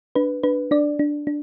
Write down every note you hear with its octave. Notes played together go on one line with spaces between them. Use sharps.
D4 B4
D4 B4
D4 D5
D4
D4